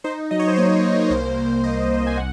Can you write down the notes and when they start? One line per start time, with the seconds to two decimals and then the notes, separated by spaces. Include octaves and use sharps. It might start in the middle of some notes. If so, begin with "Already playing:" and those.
0.04 D#4 C5
0.31 F#3 D#5
0.39 C#5
0.48 C5
0.56 A#3 C#5
0.85 A#3
1.10 C2 C5
1.38 C2
1.64 C2 D#5
1.90 C2
2.07 G#5
2.17 F#5